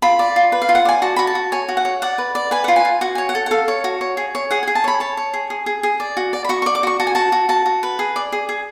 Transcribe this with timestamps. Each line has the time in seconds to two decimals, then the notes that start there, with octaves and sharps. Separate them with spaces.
0.02 F4 B5
0.19 D5
0.36 F4
0.52 B4
0.62 F5
0.69 F4
0.75 F#5
0.85 D5 G#5
1.02 F#4 A5
1.16 F#4 B5
1.27 A5
1.35 F#4
1.52 C#5 G#5
1.69 F#4
1.77 F#5
1.85 C#5
2.02 D5 F#5
2.18 B4
2.35 D5
2.51 B4 G#5
2.64 F4 F#5
2.76 G#5
2.85 F4
3.01 F#4 F#5
3.15 C#5 G#5
3.29 F#5
3.35 A4
3.46 F#5
3.51 A4 F5
3.68 C#5
3.84 F#4
4.01 C#5
4.17 G#4
4.35 C#5
4.51 G#4 F#5
4.63 G#4 G#5
4.75 A5
4.84 C#5 B5
5.00 C#5 A5
5.17 C#5
5.34 G#4
5.50 G#4
5.66 G#4
5.83 G#4
6.00 D5
6.17 F#4
6.33 D5
6.44 B5
6.49 F#4 C#6
6.62 D5 C#6
6.75 D6
6.83 F#4 C#6
7.00 F#4 A5
7.07 G#5
7.15 F#4 A5
7.32 F#4
7.49 F#4 A5
7.66 F#4
7.83 B4
7.99 G#4
8.16 D5
8.32 G#4
8.49 G#4